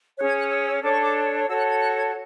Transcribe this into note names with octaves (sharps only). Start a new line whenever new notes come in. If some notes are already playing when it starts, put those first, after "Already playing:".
C#4 G#4 C#5 F#6
G#6
F#6
E6
E6
D4 A4 C#5 D6
C#6
D6
F#4 A4 C#5 E6
F#6
G#6
F#6
G#6